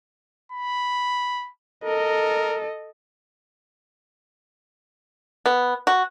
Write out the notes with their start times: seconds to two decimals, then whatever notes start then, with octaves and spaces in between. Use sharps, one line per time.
0.52 B5
1.84 A4 A#4 D#5
5.46 B3
5.87 F#4